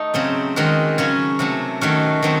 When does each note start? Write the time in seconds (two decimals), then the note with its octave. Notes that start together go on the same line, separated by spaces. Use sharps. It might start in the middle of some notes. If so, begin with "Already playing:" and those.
Already playing: A3 D#4
0.14 C#3 F#3 C4
0.56 D#3 G#3 C4 F#4
0.98 C#3 F#3 C#4
1.39 C3 F#3 A3
1.81 D#3 A3 C#4 F#4
2.22 D#3 F#3 C4